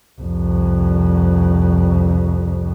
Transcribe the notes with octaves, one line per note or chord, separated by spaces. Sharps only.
C2 F2